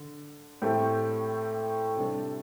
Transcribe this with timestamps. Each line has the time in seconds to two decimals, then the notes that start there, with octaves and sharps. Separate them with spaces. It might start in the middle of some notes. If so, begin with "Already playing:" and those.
Already playing: D3
0.62 A2 A3 C4 G4
1.97 C3 G3 D4 A4